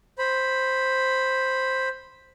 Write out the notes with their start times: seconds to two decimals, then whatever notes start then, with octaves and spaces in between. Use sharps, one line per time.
0.18 C5 B5